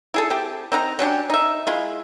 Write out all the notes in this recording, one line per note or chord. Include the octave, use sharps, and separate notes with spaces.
E4 G#4 A4
C4 G4
C4 D#4 F5 A#5
F#3 C#4 D4 G4
D#4 E5
G#3 E4 F4